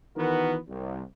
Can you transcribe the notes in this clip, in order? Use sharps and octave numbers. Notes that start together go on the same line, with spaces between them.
D#3 E3 B3 F#4 A#4 B4
C2